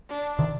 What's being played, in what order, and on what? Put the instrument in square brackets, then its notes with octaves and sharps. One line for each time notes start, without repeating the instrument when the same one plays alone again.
[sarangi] D4
[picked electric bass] C3 D#3